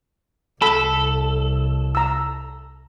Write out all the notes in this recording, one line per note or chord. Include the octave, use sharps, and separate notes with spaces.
C2 A4 B5
A#5 E6